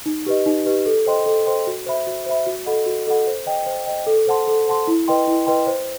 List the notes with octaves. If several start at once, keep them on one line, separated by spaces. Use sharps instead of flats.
D#4
G4 B4 D#5
D#4
G4 B4 D#5
A4
C5 D#5 G5 C6
A4
C5 D#5 G5 C6
F#4
C5 E5 B5
F#4
C5 E5 B5
F#4
A4 D#5 F#5 B5
F#4
A4 D#5 F#5 B5
C5
D#5 G5
C5
D#5 G5
A4
C5 F#5 A5 C6
A4
C5 F#5 A5 C6
E4
B4 D#5 G5 C6
E4
B4 D#5 G5 C6
C5